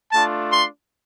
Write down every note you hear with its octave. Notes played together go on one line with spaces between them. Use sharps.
A3 D4 F4 A5
C6